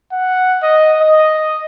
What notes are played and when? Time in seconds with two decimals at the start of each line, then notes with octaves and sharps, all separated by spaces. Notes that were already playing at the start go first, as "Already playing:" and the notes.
0.12 F#5
0.63 D#5
1.01 D#5